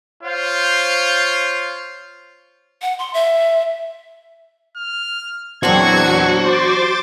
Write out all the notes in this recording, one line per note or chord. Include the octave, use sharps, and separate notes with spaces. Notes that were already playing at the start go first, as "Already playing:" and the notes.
F4 C5 C#5 F5
F#5
C6
E5
F6
E2 A#2 F#3 C4 D4 F#4 G#6 C#7
C5 C6 D6 A6